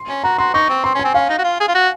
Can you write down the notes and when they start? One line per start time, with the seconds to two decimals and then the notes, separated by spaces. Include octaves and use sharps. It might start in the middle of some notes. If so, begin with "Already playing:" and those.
Already playing: C6
0.09 C#4
0.24 F#4 A#5
0.38 F#4 C6
0.54 D#4 C#6
0.69 C4
0.84 C4 C6
0.95 C#4
0.99 G#5
1.05 C4
1.14 C#4 F5
1.30 D#4
1.39 F#4
1.44 F4
1.60 G#4
1.68 F4
1.75 F#4